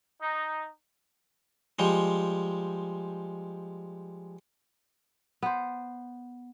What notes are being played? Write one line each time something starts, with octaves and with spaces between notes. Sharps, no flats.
D#4
F3 G3 G#3
B3 C5